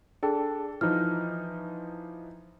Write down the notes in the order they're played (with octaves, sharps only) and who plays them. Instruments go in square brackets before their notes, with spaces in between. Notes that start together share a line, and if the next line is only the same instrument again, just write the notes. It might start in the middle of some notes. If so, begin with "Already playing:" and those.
[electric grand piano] D4 A4 [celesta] G#4 G5 A5
[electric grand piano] E3 F3 D#4 [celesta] F6